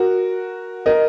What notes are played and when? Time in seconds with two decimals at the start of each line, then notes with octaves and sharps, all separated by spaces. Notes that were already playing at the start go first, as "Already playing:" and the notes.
Already playing: F#4 A#4
0.86 A#4 D#5